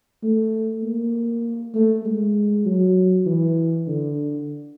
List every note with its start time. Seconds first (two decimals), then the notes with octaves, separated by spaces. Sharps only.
0.23 A3
0.83 A#3
1.74 A3
2.05 G#3
2.65 F#3
3.26 E3
3.87 D3